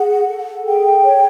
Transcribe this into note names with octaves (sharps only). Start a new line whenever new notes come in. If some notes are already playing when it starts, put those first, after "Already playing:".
Already playing: G#4 F#5
A4
G#4 G5
C#5